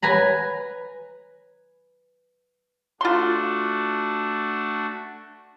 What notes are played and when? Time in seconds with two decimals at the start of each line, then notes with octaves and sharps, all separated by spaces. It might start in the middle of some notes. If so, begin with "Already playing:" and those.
0.02 B4 G#5 A#5 B5
3.01 A3 D4 F4 F#4 C6